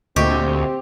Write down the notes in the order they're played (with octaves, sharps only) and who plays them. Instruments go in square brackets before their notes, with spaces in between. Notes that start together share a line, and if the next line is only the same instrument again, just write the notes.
[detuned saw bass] D2 [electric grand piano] A#2 D#5 C#6 [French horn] C4 [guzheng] G4